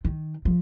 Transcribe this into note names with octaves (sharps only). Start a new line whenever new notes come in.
D#3
F3